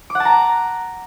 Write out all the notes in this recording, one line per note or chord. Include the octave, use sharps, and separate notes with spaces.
D6
F#5
A5
A#5